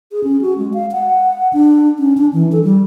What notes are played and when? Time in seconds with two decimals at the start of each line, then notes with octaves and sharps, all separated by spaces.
0.12 G#4
0.24 C#4
0.41 F#4
0.58 G#3
0.74 F5
0.92 F#5
1.53 D4
1.99 C#4
2.17 D4
2.33 E3
2.52 A4
2.63 G3